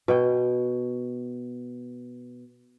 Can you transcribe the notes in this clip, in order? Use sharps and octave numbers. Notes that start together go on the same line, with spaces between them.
B2 G5